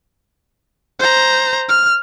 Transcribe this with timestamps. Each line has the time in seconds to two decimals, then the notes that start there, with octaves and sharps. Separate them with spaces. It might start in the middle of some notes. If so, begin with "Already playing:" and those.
1.00 C5 A#5
1.69 F6